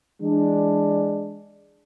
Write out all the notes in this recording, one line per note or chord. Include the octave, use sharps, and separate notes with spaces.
E3 G#3 D4